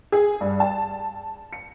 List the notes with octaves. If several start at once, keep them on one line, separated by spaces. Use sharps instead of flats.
G#4
G2
A5
C#7